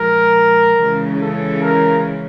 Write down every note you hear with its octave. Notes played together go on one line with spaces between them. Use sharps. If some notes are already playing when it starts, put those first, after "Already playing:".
Already playing: A#2 F3 G#3 A#4
C#3 E3 G#3
A4
A#4